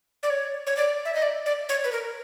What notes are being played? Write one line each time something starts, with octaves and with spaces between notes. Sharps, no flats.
D5
C#5
C#5
D5
E5
D#5
D5
D5
C#5
B4
A#4